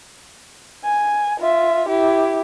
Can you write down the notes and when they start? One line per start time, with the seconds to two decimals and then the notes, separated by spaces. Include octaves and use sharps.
0.84 G#5
1.40 F4 E5
1.88 E4 G4